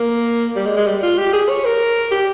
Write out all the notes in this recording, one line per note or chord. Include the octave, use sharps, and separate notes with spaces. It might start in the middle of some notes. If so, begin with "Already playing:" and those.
Already playing: A#3
G3
G#3
G#3
G3
F4
G4
G#4
C#5
A#4
G4